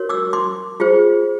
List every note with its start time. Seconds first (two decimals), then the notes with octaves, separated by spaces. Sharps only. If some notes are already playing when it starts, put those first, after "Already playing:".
Already playing: F#4 A#4 C#5
0.09 D6 E6
0.33 C6 D6
0.80 F4 G#4 C5